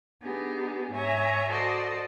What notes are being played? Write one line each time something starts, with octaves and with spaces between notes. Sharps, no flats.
B3 D4 D#4 G4 G#4
G#2 C#5 E5 G#5 A#5 C#6
F#4 A4 C5 D5 D#5